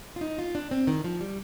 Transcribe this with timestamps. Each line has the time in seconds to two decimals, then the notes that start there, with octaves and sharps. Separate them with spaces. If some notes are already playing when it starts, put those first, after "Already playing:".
0.16 F4
0.21 D#4
0.38 F4
0.55 D4
0.71 C4
0.87 D#3
1.04 F3
1.21 G3